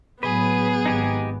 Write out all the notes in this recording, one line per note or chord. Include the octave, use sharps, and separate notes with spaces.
A2 F#3 B3 G#4 B4
G#1 D#4 G4 G#5